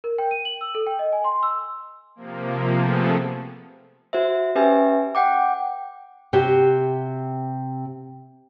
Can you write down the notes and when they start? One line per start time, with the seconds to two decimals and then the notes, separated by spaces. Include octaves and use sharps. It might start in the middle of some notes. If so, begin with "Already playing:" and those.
0.04 A#4
0.18 G5
0.31 D#7
0.45 F#7
0.61 E6
0.75 A4
0.87 G5
0.99 D#5
1.12 G#5
1.24 C6
1.43 E6
2.16 C3 F3 A#3
2.75 C3 F3 A3 B3 G#4 A4
4.13 F#4 C5 E5
4.55 C#4 G4 B4 E5 G#5
5.15 F#5 G5 D6
6.33 C3 F#4 G4